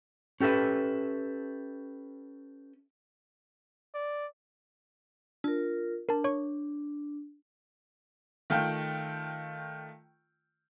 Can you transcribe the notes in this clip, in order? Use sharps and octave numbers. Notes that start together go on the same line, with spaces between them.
C#4 G4 A4 B4 E5
D5
D4 F4 A#4
D4 A#4 A5
C#5 C#6
D#3 A3 F4 G5